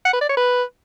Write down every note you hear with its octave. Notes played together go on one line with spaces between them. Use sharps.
F#5
B4
D5
C#5
B4